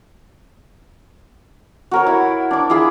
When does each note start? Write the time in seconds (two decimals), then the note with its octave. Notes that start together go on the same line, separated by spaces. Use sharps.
1.91 F#4 A#4 C#5
2.07 E4
2.51 D4 D6
2.70 E4 F4 G#4 E5